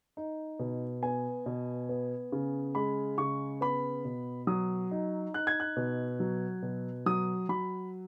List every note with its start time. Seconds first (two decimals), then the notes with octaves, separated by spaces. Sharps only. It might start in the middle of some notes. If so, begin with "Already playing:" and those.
0.17 D#4
0.59 B2
1.03 B3 G#5
1.46 B2
1.89 B3
2.32 C#3
2.75 G#3 B5
3.18 C#3 C#6
3.61 B3 B5
4.05 B2
4.47 F#3 D#6
4.91 D#4
5.34 D#4 F#6
5.47 G#6
5.60 F#6
5.76 B2
6.20 F#3
6.62 B2
7.06 F#3 D#6
7.49 F#3 B5